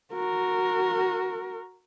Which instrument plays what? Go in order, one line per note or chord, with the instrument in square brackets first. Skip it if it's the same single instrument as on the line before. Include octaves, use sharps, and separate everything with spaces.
[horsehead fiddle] F#4 A#4